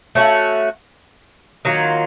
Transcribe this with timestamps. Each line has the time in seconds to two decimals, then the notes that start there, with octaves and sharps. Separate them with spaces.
0.15 A3 C#4 F#4
1.65 D#3 F#3 A#3 F4